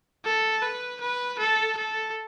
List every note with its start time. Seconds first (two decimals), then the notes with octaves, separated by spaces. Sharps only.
0.25 A4
0.62 B4
1.01 B4
1.39 A4
1.77 A4